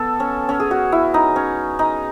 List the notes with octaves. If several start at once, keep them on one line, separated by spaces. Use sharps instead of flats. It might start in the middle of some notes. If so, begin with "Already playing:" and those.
Already playing: B3 A4
C#4
C#4
G#4
F#4
E4
D#4
C#4
D#4